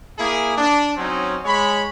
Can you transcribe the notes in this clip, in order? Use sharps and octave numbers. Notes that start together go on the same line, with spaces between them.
A#3 E4 G#4
D4
F#3 C4 C#4 D#4
G#3 C#5 B5